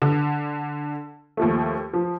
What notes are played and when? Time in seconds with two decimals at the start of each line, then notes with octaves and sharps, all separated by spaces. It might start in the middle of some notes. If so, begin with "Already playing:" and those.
0.02 D3
1.37 D#2 F3 A3
1.94 F3